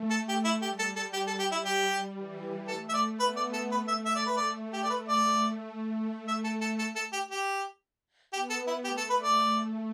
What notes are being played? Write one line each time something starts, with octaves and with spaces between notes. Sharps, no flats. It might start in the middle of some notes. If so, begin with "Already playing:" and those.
Already playing: A3
A3 A4
G4
E4
G3 G4
A4
A4
G4
A4
G4
E4
G4
E3
A3 A4
E5
D5
B3 B4
D5
A4
A3 B4
E5
E5
D5
A3 B4
D5
A3 G4
D5
B4
D5
A3 E5
A4
A4
A4
A4
G4
G4
B3 G4
A4
E4
A3 G4
A4
B4
D5
A3